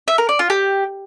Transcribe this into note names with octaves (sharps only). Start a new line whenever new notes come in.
E5
A#4
D5
F4
G4